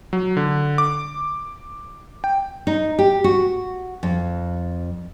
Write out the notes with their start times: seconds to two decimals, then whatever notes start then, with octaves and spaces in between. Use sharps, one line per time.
0.13 F#3
0.37 D3
0.78 D6
2.24 G5
2.67 D#4
2.99 G4
3.24 F#4
4.03 F2